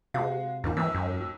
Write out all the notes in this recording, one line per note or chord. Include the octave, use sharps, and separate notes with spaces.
C3 G#3 F#4 F5
D#2 G#2 D#3 A#3
D#2 G#2 E3 E6
F#2